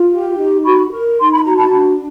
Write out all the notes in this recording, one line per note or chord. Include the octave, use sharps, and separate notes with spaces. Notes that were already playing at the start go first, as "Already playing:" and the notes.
Already playing: F4
G4
D#4
F#4 B5 C#6
A#4
D#4 C6
B5
F#4 A#5
A5 B5
D4